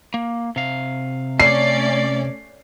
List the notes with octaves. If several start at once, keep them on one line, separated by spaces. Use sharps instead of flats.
A#3
C3 F5
A3 C#4 D5 C7